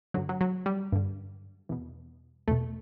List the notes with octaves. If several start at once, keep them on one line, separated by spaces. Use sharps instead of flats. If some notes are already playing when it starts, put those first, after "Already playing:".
G2 D3 F#3
F#3
F#3
G3
G2 D3
E2 B2
E2 B2 A3